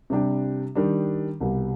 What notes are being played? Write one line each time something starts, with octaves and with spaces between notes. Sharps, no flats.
C3 G3 D4 G4
D#3 G3 D4
C2 B2 G3